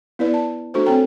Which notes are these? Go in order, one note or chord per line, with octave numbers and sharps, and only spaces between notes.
B3 E4 B4 D5
A5
A3 D4 F#4 A4 C5
C4 A4 C#5 G5 A#5